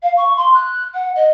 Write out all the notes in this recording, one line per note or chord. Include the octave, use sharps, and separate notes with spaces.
F5
C#6
C6
F#6
F#5
D#5